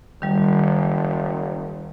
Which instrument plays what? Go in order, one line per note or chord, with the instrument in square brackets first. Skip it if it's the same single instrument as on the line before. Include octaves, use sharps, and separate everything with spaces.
[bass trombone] F#1 [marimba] D#3 G3